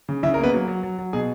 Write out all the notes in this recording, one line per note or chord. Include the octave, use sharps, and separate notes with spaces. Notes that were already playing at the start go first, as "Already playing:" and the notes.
C#3
C#3 E4 E5
A#4
A#3
B3 B4
F#3
F#3
F#3
F#3
B2 G#4